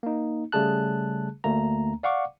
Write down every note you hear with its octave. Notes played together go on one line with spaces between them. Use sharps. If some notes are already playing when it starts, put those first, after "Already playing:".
A#3 D#4
C#3 G3 A3 G#4 A5 F#6
D2 A3 A#3 A#5
D5 F5 F#5 C#6 D6